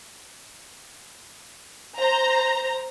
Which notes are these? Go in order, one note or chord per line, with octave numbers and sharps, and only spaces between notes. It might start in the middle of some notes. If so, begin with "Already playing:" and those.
C5 A#5